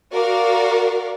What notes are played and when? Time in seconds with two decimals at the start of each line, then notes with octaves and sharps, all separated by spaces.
0.12 F#4 A#4 D5 F5